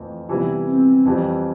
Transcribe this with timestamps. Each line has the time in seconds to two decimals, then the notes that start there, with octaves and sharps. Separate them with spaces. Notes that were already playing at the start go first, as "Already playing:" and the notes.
Already playing: F2 E3 A3 C4
0.29 C3 E3 G3 B3 E4
0.67 C4
1.05 F2 E3 G3 C4